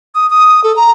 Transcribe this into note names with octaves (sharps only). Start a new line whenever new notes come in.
D#6
D#6
A4
A#5